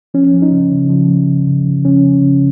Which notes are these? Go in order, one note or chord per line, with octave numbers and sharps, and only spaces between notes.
F3 C#4
F3
D#4
C#3
C#3
F3
F3
C#3
C#3
F3
F3 C#4
C#3
C#3